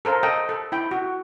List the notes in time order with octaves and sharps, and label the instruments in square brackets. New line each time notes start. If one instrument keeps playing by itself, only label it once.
[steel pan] A4 A#4 C5 F5
A4 D#5 G5
A4
E4 G5
F#4